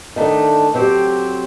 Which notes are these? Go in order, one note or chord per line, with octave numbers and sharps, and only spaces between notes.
D#3 A3 D4
F#3 C4 G4